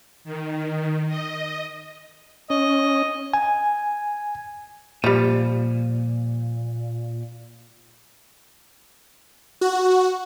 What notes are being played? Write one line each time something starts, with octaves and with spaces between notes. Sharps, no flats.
D#3
D#5
C#4 D#5
G#5
A#2 F3 G3
F#4